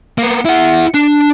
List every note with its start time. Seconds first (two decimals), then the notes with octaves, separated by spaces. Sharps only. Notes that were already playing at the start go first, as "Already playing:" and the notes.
0.18 A#3 B3
0.45 E4 F#5
0.94 D4